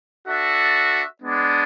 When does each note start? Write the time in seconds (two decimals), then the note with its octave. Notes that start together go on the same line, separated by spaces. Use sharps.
0.27 D4 F#4 A4 E5
1.21 G#3 B3 D4